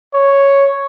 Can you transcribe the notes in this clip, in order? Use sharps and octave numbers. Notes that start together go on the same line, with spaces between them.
C#5